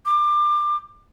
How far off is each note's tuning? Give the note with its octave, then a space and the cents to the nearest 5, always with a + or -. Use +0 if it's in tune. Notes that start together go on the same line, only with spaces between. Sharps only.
D6 +25